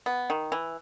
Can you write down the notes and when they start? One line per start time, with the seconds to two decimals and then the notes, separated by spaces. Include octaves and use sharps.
0.06 B3
0.30 D#3
0.52 E3